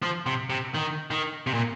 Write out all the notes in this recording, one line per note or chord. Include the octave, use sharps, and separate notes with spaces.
F3
C3
C3
D#3
D#3
C3
A#2